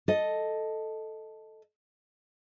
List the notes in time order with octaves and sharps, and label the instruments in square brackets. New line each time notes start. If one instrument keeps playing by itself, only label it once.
[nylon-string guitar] A4 D#5